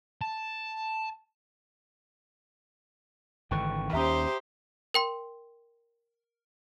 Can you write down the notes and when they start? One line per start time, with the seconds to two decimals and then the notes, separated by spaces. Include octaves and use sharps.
0.21 A5
3.51 G#1 D3 E3 G5 C#6 F#6
3.93 D#2 C#4 G4 C5 E5 A#5 D#6
4.94 A#4 G5 C6